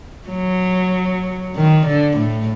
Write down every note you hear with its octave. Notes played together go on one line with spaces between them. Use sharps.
F#3
D#3
D3
A2